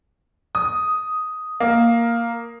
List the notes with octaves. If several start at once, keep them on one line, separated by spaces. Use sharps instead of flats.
D#6
A#3